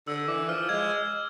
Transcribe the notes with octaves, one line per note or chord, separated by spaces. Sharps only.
D3 E6
E3 D6
F3 F6
G#3 G#6